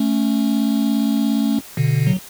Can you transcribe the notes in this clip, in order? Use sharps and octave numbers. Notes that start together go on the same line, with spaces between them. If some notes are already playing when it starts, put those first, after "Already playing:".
Already playing: A3 C#4
B2 D3
F#3